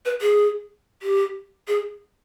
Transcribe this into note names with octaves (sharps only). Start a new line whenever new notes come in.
B4
G#4
G4
G#4